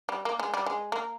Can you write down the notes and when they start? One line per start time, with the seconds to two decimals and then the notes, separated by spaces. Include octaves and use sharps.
0.09 G3
0.25 A#3
0.40 G#3
0.54 G3
0.66 G#3
0.92 A#3